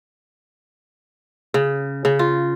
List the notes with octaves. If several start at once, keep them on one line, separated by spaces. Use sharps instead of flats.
C#3
C#3
F4